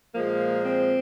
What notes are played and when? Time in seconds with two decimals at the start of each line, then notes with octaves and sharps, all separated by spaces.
0.14 A#2 F3 G#3 A#3
0.63 C4